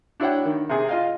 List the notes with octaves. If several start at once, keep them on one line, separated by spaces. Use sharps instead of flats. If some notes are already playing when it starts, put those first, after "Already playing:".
D4 E4 F#4 C#5 F#5 G5
D#3
C3 G#4
F4 D#5 F5